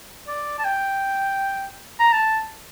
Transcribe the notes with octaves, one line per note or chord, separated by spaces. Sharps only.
D5
A5
G5
A#5
A5